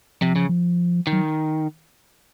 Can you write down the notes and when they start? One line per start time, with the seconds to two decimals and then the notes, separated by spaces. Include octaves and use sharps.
0.21 C3 F3
0.36 C#3
0.49 F3
1.07 D#3
1.13 F#3